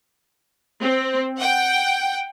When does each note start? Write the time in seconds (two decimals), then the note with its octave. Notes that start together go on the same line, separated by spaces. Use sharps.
0.82 C4
1.38 F#5 G5